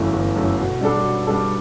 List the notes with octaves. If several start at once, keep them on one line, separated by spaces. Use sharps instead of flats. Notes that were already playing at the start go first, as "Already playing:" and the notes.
Already playing: G1 F#2 E3 A3
G1
F#2 E3 A3
B2
G3 D4 A4
B2
G3 D4 A4